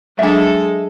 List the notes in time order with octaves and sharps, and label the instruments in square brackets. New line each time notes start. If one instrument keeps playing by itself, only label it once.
[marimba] F#3 D4 [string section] G#3 A4 [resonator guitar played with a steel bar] E5 A5